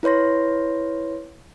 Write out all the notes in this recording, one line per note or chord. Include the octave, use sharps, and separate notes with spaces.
E4 B4 C#5 C6 A#6